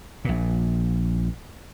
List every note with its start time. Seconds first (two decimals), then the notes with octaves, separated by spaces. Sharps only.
0.25 A#1 A#2